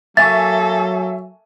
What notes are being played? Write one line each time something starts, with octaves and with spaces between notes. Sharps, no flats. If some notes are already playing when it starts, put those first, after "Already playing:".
F#3 A#3 A4 E5 G#5 C#6 A6